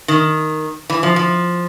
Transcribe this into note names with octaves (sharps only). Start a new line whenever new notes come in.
D#3
E3
F3
F3